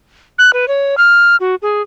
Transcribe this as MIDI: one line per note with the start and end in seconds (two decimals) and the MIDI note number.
0.38 0.51 90
0.53 0.68 71
0.68 0.95 73
0.98 1.36 89
1.40 1.55 66
1.62 1.82 68